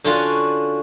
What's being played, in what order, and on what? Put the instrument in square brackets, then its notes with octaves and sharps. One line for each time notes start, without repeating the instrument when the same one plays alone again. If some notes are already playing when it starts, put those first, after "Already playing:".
[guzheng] D3 C#4 F4 F#4